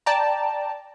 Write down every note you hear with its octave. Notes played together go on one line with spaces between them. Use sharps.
D5 G5 A5 A#5